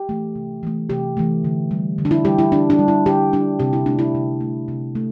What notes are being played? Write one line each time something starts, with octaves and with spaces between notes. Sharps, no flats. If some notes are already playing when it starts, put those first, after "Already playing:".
Already playing: G4
E3 A3
C3
E3 A3
C3 G4
E3 A3
D3
G3
D3
D4
E4
G3 G4
E4
D3 D4
D4
G3
E4
D3 G4
G3 D4
C3 G4
E4
A3 D4
E4
C3
A3
C3
A3